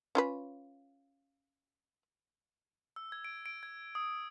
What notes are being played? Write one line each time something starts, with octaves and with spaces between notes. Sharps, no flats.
C#4 F4 B4
E6
G#6
D7
D7
G#6
D#6